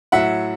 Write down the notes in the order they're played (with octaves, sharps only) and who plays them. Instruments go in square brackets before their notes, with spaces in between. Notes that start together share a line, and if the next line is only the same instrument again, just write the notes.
[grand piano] A2 F#3 E5 F#5